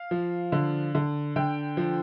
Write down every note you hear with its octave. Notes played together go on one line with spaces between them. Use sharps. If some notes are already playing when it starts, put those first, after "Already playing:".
Already playing: F5
F3
D3
D3
D3 G5
F3